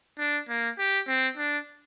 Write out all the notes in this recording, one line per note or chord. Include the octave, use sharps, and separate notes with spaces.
D4
A#3
G4
C4
D4